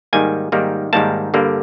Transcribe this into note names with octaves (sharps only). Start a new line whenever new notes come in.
G#2 D#3 G3 A#3 G#5
G#2 D#3 G3 A#3
G#2 D#3 G3 A#3 A5
G2 D3 G3 A#3